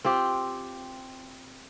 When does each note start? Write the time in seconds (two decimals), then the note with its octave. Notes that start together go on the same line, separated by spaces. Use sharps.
0.05 C4 F4 G4